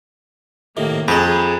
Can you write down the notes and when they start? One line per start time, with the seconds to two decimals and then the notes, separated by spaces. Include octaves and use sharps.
0.77 A2 C3 D#3 A#3
1.08 F2 G#4 B4 C5 D#5 A#5 B5